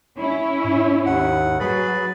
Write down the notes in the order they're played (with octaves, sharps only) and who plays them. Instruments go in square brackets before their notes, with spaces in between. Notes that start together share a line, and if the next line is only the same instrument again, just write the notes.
[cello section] C#4 E4
[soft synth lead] G#2
[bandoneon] D#2 F#5
[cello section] F#3 [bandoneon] G#4 B4 B5 [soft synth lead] A6